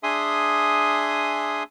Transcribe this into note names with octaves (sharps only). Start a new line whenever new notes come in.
D4 G#4 E5 G#5 C6 D#6